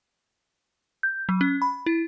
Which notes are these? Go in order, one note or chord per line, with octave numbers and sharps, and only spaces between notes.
G6
F#3
C#4
B5
E4